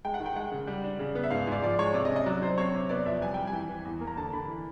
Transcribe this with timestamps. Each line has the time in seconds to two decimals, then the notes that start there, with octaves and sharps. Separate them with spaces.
0.05 G#3 G5
0.14 F#5
0.20 D#3
0.26 G5
0.36 G#3 F#5
0.52 C#3
0.67 G3
0.84 D4
0.99 C#3
1.15 B3
1.24 E5
1.31 G#2 F5
1.47 G#2 D5
1.62 F3 D5
1.79 G#3 C#5
1.94 C3 D5
2.05 D#5
2.11 C#4
2.16 D#5
2.26 F#3 D5
2.42 F#3 C5
2.58 C4 C#5
2.74 C3
2.89 B3 D5
3.06 F2 E5
3.21 G3 G#5
3.34 G3 G5
3.47 G#5
3.53 E3
3.69 E3
3.85 E2
4.01 A#3
4.07 A#5
4.17 D3 A5
4.33 D3 B5
4.48 E3